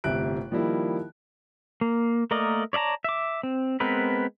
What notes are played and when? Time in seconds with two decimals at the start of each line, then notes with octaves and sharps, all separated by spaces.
0.04 G1 A2 C3 E5 F#6 D7
0.51 D#3 F3 G3 A#3 E4
1.81 A#3
2.31 A3 A#3 A#4 D5 D#5
2.73 C#5 D5 E5 A5 A#5
3.04 E5 D6
3.43 C4
3.80 G#3 B3 C4 A#4 B4